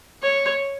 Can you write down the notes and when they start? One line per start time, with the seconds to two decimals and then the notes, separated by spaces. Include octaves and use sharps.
0.23 C#5